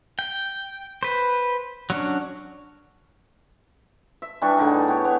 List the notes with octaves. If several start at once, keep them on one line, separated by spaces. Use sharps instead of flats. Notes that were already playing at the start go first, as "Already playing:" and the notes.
G5
B4 C5
F#3 C#4 D4
E5
E3 G3 D4 C#6
A2 D3 D#4 G#4
E3
B3 G4 C#5
B3 C#5